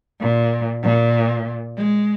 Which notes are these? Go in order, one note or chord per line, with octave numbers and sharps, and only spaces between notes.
A#2
A#2
G#3